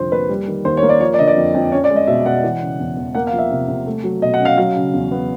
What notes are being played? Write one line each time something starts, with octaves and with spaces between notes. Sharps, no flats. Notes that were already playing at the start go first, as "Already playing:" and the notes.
Already playing: C2 F2 D3 F3 C5
A#3 B4
G3
D#3
D#2 C5
C#5
A#3
D5
F3 C#5
D5
D3 D#5
D5
F2
F2
C#4 C#5
D5
G#3
D#5
B2 E5
B2 F#5
E3
C#3
E2
E2
A#3 F#5
F5
F3
E5
C3
C3
A3
F#3
B2 D#5
F#5
C#4
F5
F#3 F5
C#3
E2
B3